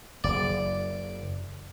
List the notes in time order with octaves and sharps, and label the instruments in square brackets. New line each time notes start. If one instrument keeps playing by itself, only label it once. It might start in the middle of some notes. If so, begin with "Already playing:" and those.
[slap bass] F#1 [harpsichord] D5